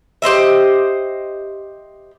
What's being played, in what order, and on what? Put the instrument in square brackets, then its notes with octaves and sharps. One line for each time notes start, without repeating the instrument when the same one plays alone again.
[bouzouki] G4 C5 D#5 E5